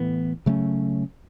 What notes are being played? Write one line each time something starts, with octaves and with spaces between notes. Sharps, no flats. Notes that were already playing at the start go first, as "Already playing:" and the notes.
Already playing: A2 E3 B3
C#3 F#3 A3 C#4